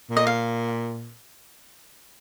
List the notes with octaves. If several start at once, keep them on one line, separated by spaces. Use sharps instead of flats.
A#2
D#5
F5